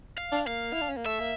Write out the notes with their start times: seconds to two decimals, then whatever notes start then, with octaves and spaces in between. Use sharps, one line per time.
0.18 F5
0.32 D4
0.47 A#3 F5
0.73 E4
0.81 D4
0.89 C#4
0.97 A#3
1.06 A3 E5
1.20 A#3